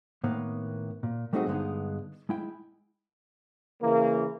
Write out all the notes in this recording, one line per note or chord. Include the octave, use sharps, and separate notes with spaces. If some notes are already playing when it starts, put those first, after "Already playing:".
A2 D#3 A#3 B3
A#2
G3 A3 C4 D#4 F#4 G#4
G2 D3 G#3 B3 D#4
G#3 E4 G5
C#3 E3 A#3